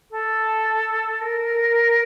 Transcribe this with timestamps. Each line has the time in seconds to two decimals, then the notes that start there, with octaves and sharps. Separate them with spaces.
0.11 A4
1.21 A#4